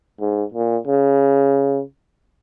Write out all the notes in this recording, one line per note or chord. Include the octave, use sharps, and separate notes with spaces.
G#2
A#2
C#3